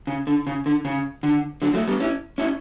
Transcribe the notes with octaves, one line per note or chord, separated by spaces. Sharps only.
C#3
D3
C#3
D3
C#3
D3
D3 F#3
F#3 A3
G3 B3
C#4 E4
C#4 E4